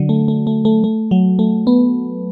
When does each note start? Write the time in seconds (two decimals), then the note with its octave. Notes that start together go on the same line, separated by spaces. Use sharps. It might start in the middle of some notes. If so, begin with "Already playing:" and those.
Already playing: D3 F#3
0.09 A3
0.28 A3
0.47 A3
0.65 A3
0.84 A3
1.11 F#3
1.39 A3
1.67 B3